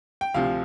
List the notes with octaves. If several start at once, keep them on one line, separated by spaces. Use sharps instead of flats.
G5
D2 C3 F3 F5